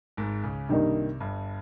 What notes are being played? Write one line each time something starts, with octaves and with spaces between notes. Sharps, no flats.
G#1 G#2
C#2 C#3
C2 G2 C3 D#3 G3 A#3 D#4
G1 G2